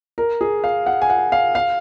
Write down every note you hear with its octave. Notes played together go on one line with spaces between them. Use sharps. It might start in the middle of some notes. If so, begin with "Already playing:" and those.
A#4
G#4
F5
F#5
G#5
F#5
F5
F5